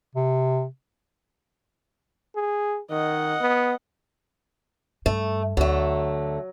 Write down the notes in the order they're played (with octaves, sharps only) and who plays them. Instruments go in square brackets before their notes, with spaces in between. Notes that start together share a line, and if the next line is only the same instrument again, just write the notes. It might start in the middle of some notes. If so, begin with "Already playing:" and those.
[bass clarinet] C3
[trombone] G#4
[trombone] D#3 [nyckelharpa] D#5 F#5
[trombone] B3
[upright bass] G2 [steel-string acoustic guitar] A3
[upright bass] D2 [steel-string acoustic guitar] D3 A3 [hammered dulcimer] F#3